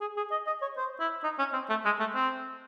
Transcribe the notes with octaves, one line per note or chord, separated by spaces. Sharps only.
G#4
G#4
D#5
D#5
C#5
C5
E4
D#4
C#4
C4
A3
G#3
A3
C4